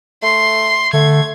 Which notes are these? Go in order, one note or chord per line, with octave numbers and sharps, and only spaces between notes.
A3 C6
D3 A3 G#6